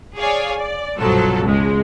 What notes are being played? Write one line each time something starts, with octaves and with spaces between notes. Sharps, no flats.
G#4 C#5 D5 F5 G#5
D5
G1 C2 B2 F3 F#3 A4
C#2 G#3